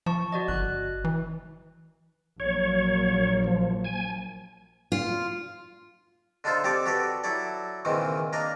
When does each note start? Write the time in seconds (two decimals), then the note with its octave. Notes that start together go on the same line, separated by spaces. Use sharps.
0.06 F3 A5 C#6
0.32 F#4 D5 D#5
0.48 G1 F#6
1.05 E3
2.40 A#1 F#3 A#3 C#5
3.44 F3
3.85 G#5
4.92 F4
6.44 D3 D4 D#4 F4 A4 C5
6.64 C4 G4 A4 D5 D6
6.86 F#4 G4 A4 B4 D5
7.24 F#3 E4 A4 D5
7.85 C#2 A#2 D#3 E3 C4
8.33 A#3 D4 A#4 D#5